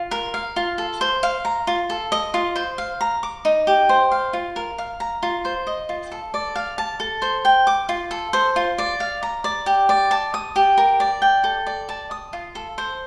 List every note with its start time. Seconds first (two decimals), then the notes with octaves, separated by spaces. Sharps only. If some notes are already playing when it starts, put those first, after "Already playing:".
Already playing: F4
0.11 A#4
0.34 F5
0.56 F4
0.78 A4
1.01 C5
1.23 F5
1.45 A#5
1.67 F4
1.90 A4
2.12 D#5
2.34 F4
2.56 C5
2.78 F5
3.01 A#5
3.23 D6
3.45 D#4
3.67 G4
3.89 C5
4.12 F5
4.33 F4
4.56 A#4
4.78 F5
5.00 A#5
5.23 F4
5.45 C5
5.67 D#5
5.89 F4
6.12 A4
6.34 D5
6.56 F5
6.78 A5
7.00 A4
7.22 C5
7.45 G5
7.67 D6
7.89 F4
8.11 A4
8.33 C5
8.56 F4
8.78 D5
9.00 F5
9.23 A#5
9.44 D5
9.66 G4
9.89 D5
10.11 A5
10.34 D#6
10.56 G4
10.78 A#4
11.00 D5
11.22 G5
11.44 A4
11.67 D5
11.89 A5
12.11 D#6
12.33 F4
12.55 A4
12.78 C5